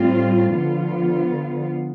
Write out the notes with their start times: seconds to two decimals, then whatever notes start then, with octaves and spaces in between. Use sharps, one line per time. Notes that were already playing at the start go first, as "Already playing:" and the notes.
Already playing: A2 G3 C4 F4
0.54 D3 F3 B3 F4